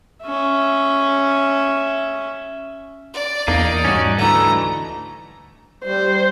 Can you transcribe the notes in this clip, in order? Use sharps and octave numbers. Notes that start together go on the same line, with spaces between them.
C#4 E5
D5
E2 A#3 D4 D#4
G#2 G3 C#4 F#4
D2 E3 A3 A#5
G3 C5